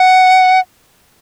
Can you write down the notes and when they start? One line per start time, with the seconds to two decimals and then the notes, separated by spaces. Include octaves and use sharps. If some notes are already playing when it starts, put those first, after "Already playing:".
Already playing: F#5